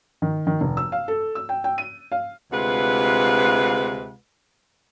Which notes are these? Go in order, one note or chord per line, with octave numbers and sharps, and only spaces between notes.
D#3
D#3
F1
E6
F5
A4
E6
G5
G5
D#7
F5
D2 C3 G#3 F4 B4 F#5